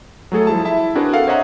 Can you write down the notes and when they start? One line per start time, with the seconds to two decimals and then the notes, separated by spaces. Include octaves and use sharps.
0.32 F#3 A3 G#4 A4
0.47 F3 G3 E4 G#4 A5
0.65 E4 E5 A5
0.95 C4 D4 F#4 G#4 A#4 B4
1.13 A4 F5 F#5
1.27 C5 C#5 D#5 E5 F#5 A#5